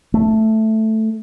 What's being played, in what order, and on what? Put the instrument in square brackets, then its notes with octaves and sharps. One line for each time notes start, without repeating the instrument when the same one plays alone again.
[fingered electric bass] A3